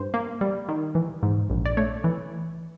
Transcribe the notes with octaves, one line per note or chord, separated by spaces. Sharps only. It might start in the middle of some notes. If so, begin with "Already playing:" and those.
Already playing: G2 C5
A#3
G3
D#3
E3
G#2
A#1
D5
A3 C#5
E3